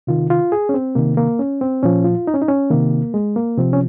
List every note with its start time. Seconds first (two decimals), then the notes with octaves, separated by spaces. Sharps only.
0.07 C3 D#3 F4
0.30 F4
0.52 G#4
0.69 C#4
0.74 C4
0.95 C3 D#3 A#3
1.17 A#3
1.39 C#4
1.61 C4
1.83 A#2 F3 C#4
2.04 F4
2.27 D#4
2.34 C#4
2.41 D#4
2.48 C#4
2.70 C3 D#3 A#3
3.14 G#3
3.36 A#3
3.58 C3 F3 C4
3.73 C#4